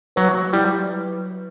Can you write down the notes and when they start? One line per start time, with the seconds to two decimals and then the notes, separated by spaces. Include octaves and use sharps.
0.16 F#3 B4
0.34 F#3
0.53 G3 E4